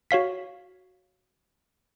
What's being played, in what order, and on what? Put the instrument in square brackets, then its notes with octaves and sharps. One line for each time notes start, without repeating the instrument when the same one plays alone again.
[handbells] F#4 C#5 F5 B6